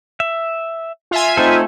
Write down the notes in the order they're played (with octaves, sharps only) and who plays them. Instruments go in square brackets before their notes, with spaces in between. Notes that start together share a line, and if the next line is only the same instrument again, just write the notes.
[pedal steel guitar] E5
[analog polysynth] F4 E5 G#5
[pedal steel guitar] A3 A4 [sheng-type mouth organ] C4 D#4 C5